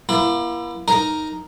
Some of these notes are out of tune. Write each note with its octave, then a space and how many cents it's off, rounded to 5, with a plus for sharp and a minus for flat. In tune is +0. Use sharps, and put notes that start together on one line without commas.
A#3 +40 E4 +30
D#4 +0 A#4 +0